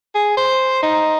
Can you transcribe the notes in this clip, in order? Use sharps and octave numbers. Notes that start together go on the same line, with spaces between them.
G#4
C5
D#4